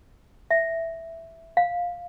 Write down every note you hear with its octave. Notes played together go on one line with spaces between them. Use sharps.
E5
F5